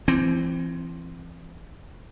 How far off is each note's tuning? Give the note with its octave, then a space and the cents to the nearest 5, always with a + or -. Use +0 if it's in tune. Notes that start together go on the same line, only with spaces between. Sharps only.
E3 +35 C4 +0